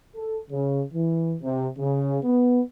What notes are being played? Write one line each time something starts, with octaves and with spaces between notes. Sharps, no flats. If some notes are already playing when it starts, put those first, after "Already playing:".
A4
C#3
E3
C3
C#3
B3